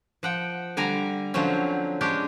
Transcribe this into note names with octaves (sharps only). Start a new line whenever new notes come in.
F3 F#5 G5
D3 G3 G#5 A#5
D3 F3 F#3 C4 C#4
G#3 C#4 D4 G4